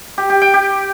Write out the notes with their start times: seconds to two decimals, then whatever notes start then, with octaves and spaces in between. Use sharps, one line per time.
0.18 G4
0.30 G4
0.42 G5
0.54 G4